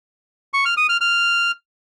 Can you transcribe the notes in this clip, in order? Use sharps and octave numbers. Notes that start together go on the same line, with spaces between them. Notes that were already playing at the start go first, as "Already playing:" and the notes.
C#6
F6
D#6
F6
F6